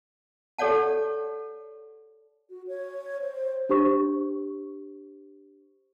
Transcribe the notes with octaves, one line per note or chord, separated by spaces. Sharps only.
G4 A4 C#5 D5 F#5 A5
F#4
C#5
C5
D4 G4 C5 C#6